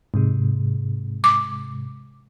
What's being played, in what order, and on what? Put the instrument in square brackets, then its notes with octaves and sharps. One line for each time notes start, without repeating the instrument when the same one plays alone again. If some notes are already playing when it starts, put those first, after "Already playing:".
[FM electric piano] G#2 C3 G#3
[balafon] D6